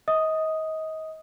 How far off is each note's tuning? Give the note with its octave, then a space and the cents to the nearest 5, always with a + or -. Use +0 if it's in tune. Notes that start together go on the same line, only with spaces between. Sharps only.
D#5 +30 D#6 +0